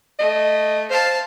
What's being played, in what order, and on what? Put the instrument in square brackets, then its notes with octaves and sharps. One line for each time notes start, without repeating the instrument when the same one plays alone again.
[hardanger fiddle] A3 [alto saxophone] D#5
[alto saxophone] C5 [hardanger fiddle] F5 A5